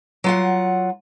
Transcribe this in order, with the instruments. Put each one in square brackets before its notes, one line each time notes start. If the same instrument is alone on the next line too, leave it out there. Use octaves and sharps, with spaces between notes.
[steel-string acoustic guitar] F#3 F4 F#5